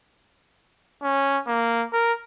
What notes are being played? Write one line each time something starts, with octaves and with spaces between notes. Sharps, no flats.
C#4
A#3
A#4